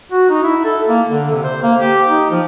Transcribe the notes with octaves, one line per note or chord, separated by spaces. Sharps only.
F#4
D#4
E4
A4
A#3
D3
C3
C5
A#3
G4
D#4
F3